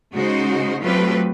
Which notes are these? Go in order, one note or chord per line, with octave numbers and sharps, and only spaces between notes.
C#3 G#3 D#4 F#4 C5
F#3 A3 C4 F4 G4 B4